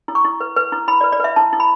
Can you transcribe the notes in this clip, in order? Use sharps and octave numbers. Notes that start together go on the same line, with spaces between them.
E4
C#6
E4
B4
B4
E4
E4 B5
D5
B4
D5
B4 E5
E4 A5
E4
B5